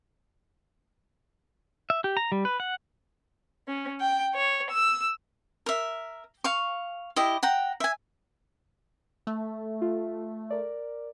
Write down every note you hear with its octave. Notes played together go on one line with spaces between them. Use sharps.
E5
G4
A#5
G3
B4
F#5
C#4
G5
C#5
E6
A#4 E5
F5 C#6
E4 G4 D#5
F#5 G5 A#5
E5 G#5
A3
F4
A#4 D5